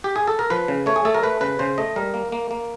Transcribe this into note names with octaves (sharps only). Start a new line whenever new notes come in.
G4
G#4
A4
A#4
F3 B4
C#3
A3 C#5
G#4
A3 A4
A#4
A3 B4
C#3 B4
C#3 C5
A3 D#5
G3 A#4
A#3
A#3
A#3